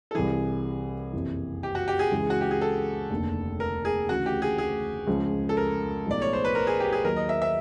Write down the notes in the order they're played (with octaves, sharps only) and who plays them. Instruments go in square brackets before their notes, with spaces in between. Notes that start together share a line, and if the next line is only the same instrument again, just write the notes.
[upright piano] A4
[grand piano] C2 C3 E3 [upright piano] G#4
[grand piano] F#1 F2 C3 E3
[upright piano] G4
F#4
G4
G#4
[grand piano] C#2 C#3 E3
[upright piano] F#4
G4
G#4
A4
[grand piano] F1 D#2 D3
[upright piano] A#4
G#4
[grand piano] D2 C#3 E3 [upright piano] F#4
[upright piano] G4
G#4
G#4
[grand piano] C#2 C#3 F3
[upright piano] A4
A#4
[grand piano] B1 A2 F3 G#3 [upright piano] D5
[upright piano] C#5
C5
B4
A#4
G#4
G4
G#4
[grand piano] D#2 D#3 F#3 [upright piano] A#4
[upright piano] D#5
E5
E5